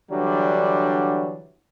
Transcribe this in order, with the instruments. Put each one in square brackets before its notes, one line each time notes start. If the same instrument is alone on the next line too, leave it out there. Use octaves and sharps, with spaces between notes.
[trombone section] D3 E3 F#3 G3 D4